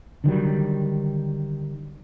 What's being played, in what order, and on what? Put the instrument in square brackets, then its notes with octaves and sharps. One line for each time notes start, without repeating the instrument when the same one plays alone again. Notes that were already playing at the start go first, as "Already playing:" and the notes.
[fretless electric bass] D3 D#3 F#3 G3